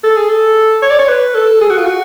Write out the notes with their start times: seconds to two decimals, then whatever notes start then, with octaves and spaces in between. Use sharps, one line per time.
0.04 A4
0.16 G#4
0.29 A4
0.82 C#5
0.90 D5
0.99 C#5
1.09 B4
1.35 A4
1.61 G#4
1.70 F#4
1.78 F4
1.85 F#4